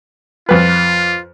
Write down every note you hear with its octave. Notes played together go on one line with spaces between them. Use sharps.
F2 F4 B4